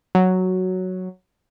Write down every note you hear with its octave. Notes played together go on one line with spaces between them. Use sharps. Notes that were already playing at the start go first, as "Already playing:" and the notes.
F#3